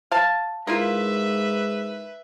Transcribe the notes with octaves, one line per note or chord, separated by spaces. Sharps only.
F5 A5
G#2 A#3 E4 F4 B4 E5